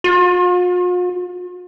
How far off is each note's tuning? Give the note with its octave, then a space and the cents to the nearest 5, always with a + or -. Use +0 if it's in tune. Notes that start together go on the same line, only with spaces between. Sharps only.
F4 +45